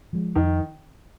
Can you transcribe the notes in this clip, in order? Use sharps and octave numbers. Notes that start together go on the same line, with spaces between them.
F3 G#3
F2 D#3